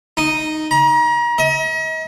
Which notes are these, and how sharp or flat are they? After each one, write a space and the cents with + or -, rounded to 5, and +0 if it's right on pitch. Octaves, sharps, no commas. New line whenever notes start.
D#4 -5
A#5 +35
D#5 +40